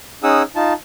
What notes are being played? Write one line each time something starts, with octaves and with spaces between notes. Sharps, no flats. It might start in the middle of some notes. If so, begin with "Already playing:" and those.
C#4 D#4 G#4 F#5 D#6 E6
D#4 F4 A5